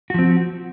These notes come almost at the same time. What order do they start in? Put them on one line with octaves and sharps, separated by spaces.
F#4 F3 C4